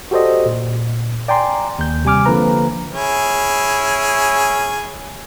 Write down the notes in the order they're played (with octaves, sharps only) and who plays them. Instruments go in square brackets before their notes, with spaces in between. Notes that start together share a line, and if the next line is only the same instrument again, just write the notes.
[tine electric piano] F#4 G4 A4 C5 D5 D#5
A#2
D5 G5 G#5 A#5 C6
D#2 G6
C3 G3 G#5 D6 F6
D3 F3 A#3 B4 A#5
[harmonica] C#4 E4 G#4